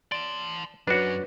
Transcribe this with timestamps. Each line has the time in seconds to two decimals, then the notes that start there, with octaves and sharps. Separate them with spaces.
0.12 D5 A5 C6
0.87 F#2 F#3 D4 F#4 B4 C#5